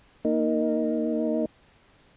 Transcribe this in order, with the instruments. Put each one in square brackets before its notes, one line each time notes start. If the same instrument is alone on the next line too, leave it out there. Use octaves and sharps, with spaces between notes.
[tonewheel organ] A#3 D#4